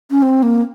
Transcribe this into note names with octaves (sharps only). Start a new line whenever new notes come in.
C#4
C4
A#3